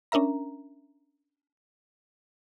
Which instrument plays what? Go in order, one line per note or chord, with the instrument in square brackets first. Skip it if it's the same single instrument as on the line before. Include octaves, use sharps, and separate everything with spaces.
[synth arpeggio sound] C#4 D4 A#4 E5 A#5